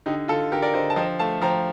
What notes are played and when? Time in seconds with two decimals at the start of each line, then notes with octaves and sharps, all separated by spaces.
0.06 D3 D#4 G4
0.28 D3 F4 A4
0.52 D3 G4 A#4
0.62 A#4 D5
0.74 D3 C5 D#5
0.90 A5
0.96 F3 D#5 G5
1.19 A3 F5 A5
1.41 F3 G5 A#5